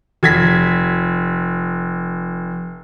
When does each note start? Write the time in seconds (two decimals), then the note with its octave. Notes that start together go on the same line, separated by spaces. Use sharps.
0.23 F1 G#6 B6